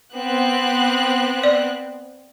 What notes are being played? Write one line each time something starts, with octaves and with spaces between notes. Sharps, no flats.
B3 C4 F#6
D5